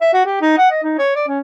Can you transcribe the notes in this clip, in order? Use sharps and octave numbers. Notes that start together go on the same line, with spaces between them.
E5
F#4
G4
D#4
F#5
D#5
D#4
C#5
D5
C#4